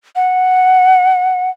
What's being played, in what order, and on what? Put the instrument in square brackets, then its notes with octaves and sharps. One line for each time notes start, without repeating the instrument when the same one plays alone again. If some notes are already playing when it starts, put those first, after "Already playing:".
[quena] F#5